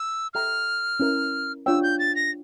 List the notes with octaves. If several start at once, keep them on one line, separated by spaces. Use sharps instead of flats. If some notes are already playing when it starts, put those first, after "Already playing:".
Already playing: E6
A4 E5 G5 A#5 F6
C#4 E4 A#4
D4 F4 C#5 G5 E6
G6
A6
A#6